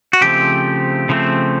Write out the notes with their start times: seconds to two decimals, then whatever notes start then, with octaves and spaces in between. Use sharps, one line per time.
0.13 F#4
0.21 C#3 F3 A3 C4 G4
1.09 C#3 F3 A3 C4